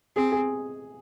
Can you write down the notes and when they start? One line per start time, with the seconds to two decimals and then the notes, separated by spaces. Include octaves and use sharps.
0.16 C4 G#4
0.32 G#4